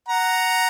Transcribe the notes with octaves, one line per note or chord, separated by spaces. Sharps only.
F#5 A#5